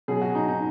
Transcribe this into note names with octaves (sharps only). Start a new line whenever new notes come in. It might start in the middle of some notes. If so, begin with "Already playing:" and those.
B2 F#3 G#4
F#4
D#4
D#4